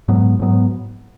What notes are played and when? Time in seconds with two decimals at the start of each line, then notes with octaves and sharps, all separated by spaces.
0.08 G#2 F#3 B3
0.40 G#2 F#3 B3